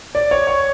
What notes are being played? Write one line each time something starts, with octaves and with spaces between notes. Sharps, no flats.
D5
C#5
C#5